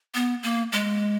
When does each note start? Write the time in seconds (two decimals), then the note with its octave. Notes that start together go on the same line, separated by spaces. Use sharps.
0.14 B3
0.43 A#3
0.72 G#3